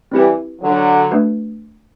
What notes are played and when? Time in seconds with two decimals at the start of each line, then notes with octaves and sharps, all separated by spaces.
0.12 E3 G3 C4 E4 G4 B4
0.61 D3 F#3
1.11 A3 D4 F#4 B4